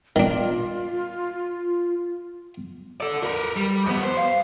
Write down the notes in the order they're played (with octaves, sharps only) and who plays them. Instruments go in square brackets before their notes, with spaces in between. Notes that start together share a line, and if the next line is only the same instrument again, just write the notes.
[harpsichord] D#3 D4 [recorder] F4
[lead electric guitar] A4 D5
A#4 B4
G3
F2 B3
C5
F5